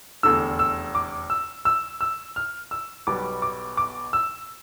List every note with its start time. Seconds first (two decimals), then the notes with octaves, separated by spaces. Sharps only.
0.23 F1 E2 D3 E6
0.59 E6
0.95 D6
1.30 E6
1.65 E6
2.01 E6
2.36 F6
2.71 E6
3.07 B1 B2 G3 B3 D6
3.42 D6
3.77 D6
4.13 E6